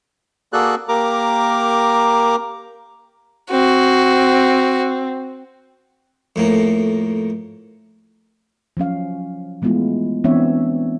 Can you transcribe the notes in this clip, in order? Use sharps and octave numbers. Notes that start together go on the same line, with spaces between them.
A#3 F#4 G#4 A4 D5 F#6
A#3 G4 A#4 A#5 D6
C4 F#4
F2 A2 A#3
F3 F#3 C#4 F5
E3 G#3 A3 B3 E4 F4
E3 B3 C4 D4 C#5 E5